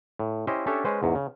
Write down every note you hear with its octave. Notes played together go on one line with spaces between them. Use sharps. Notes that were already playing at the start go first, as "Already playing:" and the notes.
A2
C#4 E4 G4 C5 D#5
C#4 D4 G4 A4 C#5 E5
G#3 C#4 B4 C5
E2 G#2
C#3